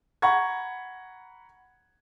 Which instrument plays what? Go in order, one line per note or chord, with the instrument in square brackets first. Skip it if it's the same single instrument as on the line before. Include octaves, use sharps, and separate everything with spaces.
[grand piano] F#5 A#5 B5 C#6 G#6